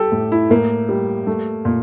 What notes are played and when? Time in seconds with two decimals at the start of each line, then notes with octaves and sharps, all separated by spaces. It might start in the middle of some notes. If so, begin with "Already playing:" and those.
Already playing: G3 G4 A4
0.12 A2
0.32 E4
0.50 A2 A#3
0.89 G3
1.27 A3
1.65 A#2